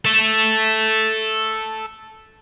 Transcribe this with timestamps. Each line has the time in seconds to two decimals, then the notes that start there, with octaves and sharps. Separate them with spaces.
0.05 A4 E5